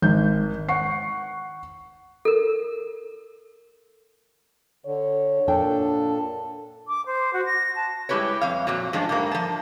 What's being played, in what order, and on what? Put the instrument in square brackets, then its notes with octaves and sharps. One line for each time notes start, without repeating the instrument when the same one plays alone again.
[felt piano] G#1 G6
F#5 C#6 C7
[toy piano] A4 A#4
[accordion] D3 [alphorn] C#5
[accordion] A#2 A4 [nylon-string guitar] D4 G5
[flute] D6
C5
F#4
A#6
A5
[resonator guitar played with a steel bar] G3 G#3 E4 G4 B4 C#5
F2 F5
F2 A#2 F#3
G2 F3 G#3 D4
G#2 G3 A#3
F3 A5